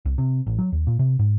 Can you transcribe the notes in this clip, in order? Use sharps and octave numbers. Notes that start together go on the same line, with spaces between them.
C2
C3
A1
F#3
D#2
A#2
C3
G#2